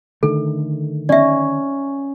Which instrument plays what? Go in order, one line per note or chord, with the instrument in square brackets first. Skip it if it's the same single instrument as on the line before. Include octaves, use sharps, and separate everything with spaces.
[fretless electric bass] D3 D#3 A3 [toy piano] A4
[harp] C#4 [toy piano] D5 E5